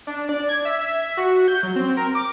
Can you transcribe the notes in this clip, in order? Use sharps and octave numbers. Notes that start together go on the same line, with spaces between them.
D4
D5
G#6
E5
E5
F#4
G6
F#3
C4
A#4
D6